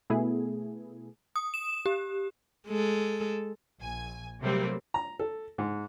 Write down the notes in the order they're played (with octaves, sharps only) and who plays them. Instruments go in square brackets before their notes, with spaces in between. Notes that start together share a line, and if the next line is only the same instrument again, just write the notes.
[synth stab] B2 A3 B3 E4 G#4
[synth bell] D#6
E7
G4
[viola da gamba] G#3 A4
[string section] A#1 G#5
C3 F#3 G3 A3 A#3 C4
[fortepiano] A#5
A4
G#2